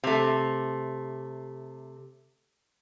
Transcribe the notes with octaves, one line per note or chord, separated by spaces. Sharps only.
C3 A3